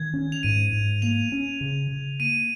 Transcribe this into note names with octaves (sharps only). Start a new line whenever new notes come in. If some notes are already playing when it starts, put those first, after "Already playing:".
Already playing: D#3 G#6
C#4
F7
G#2 D#7
G#2
A#3 F7
C#4
C#3
C#3
A#3 D#7